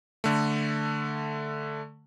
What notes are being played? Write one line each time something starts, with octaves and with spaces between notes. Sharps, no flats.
D3 A3